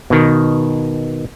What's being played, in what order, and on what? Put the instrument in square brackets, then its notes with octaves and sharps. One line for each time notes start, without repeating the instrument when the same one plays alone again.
[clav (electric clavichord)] B2 D#3